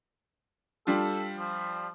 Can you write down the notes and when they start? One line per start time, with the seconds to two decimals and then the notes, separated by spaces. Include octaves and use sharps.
0.87 G3 D4 F4 A4
1.38 F3